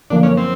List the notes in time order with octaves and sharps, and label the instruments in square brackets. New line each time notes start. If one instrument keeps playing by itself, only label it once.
[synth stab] F#2 D3 F3 A#3 [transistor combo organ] D4
[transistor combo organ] C#4
C4